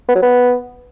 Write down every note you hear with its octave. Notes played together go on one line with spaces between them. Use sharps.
B3
F#3
B3